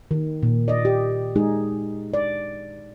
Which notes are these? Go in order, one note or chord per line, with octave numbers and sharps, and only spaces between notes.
D#3
A#2
D5 D#5
G4
G#3 D#4 G#4
D5